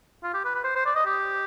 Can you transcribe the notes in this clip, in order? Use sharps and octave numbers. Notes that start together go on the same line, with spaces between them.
F4
G4
B4
B4
C5
C5
D5
D#5
G4